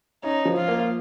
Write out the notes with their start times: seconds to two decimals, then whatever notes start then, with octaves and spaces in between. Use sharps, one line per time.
0.23 C#4 D#4
0.45 F3
0.57 F4
0.68 A#3